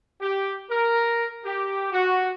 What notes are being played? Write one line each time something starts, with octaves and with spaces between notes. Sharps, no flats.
G4
A#4
G4
F#4